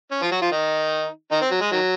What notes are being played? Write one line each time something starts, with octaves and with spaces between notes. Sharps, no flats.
C#4
F3 F4
F#3 F#4
F3 F4
D#3 D#4
D#3 D#4
C4
F#3
G#3
D#3 F#3